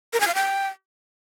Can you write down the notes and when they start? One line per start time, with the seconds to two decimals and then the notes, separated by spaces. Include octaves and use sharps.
0.13 A#4
0.20 G#5
0.28 F5
0.35 G5